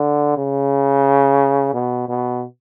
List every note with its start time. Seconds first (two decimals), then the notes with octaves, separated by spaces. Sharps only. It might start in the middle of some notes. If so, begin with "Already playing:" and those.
Already playing: D3
0.37 C#3
1.74 B2
2.08 B2